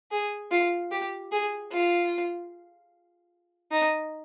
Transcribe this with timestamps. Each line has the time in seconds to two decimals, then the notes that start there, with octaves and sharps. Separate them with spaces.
0.11 G#4
0.51 F4
0.91 G4
1.31 G#4
1.72 F4
3.71 D#4